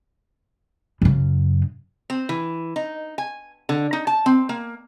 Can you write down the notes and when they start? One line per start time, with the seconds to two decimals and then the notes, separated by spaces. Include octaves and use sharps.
1.02 F#2 C#3
2.10 C4
2.29 E3
2.76 D#4
3.18 G#5
3.69 D3
3.93 D#4
4.07 A5
4.26 C4
4.49 A#3